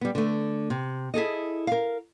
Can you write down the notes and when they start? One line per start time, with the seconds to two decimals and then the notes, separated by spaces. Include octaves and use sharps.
0.01 G3 B3
0.15 D3 A3
0.70 C3
1.14 E4 G#4 A4 D#5
1.67 A#4 F5